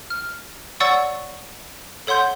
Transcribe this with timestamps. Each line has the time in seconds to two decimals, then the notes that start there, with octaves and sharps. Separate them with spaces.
0.10 F6
0.80 C#5 D5 F#5 C#6 E6 A6
2.07 A4 C#5 F#5 C6 G6